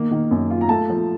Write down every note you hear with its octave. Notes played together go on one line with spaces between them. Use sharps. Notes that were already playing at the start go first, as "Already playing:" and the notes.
Already playing: D#3 A#3
D#3
F#2
F4
A#5
A3 A5
F3